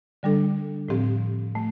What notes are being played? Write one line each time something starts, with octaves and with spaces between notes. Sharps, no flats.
D3 G3 D4 A4
A2 F3 C4 G4
A3